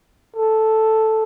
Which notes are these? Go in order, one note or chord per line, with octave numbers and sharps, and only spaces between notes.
A4